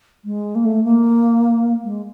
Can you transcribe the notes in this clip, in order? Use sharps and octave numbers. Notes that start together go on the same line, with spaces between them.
G#3
A#3
A3
A#3
G#3